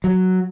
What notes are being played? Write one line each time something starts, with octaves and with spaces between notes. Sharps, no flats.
F#3